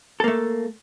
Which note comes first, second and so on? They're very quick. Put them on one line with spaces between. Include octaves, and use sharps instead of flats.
A4 A#3 A3